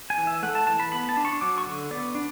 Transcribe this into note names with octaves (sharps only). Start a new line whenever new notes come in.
G#5
E3
E5
A3 F#5
A5
E3 A5
B5
B3 B5
A5
D4
C#6
F#3 D6
C#6
D3
B3 D5
D4